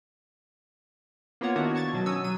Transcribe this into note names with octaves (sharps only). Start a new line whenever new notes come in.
A#3 B3 F4 C#5 F#5
D#3 A#3 B3 D4 E4 F#4
A5 C#6 G#6 A6
B2 F#3
C#4 D#6 E6
F#3 D#7